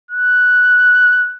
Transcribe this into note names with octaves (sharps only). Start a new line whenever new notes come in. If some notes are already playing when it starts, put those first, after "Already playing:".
F#6